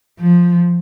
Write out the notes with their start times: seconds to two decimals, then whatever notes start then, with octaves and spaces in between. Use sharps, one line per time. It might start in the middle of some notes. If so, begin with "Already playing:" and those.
0.19 F3